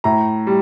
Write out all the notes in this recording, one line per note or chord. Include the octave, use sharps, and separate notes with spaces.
A2 A#5
G3